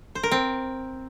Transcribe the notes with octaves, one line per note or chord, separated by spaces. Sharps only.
C5
A#4
C4